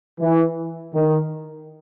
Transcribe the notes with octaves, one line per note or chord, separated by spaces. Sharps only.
E3
D#3